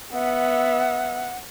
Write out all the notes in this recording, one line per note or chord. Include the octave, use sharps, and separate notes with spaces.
B3 E5 F#5